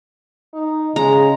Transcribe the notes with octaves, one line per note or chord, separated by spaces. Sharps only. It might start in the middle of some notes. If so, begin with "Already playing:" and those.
D#4
C#3 G#3 A#5